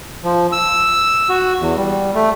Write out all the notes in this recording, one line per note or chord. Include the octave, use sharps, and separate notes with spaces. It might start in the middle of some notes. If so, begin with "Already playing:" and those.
F3
E6
F#4
E2
G3
A3